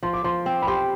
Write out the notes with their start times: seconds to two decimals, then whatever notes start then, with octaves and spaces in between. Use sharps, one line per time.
0.03 F3 C6
0.13 D6
0.24 F3 C6
0.46 C4
0.62 B5
0.67 G4 C6